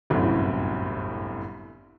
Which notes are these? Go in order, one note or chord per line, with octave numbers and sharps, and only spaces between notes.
G1 C2 F#2 A2